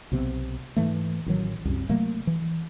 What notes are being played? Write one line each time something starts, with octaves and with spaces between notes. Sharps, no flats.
B1 C3 B3
G#2 E3 A3
A1 D#3 F#3
C2 F#2
C3 F#3 A3 A#3
E3